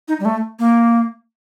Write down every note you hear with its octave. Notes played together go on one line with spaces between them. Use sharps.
D#4
G3
A3
A#3